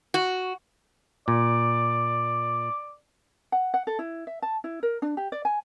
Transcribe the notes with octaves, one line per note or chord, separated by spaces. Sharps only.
F#4
A#2 D5
F#5
F#5
A4
E4
E5
A5
E4
A#4
D4
G4
D5
G#5